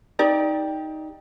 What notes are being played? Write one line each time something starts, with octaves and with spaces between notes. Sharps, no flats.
D#4 G4 D5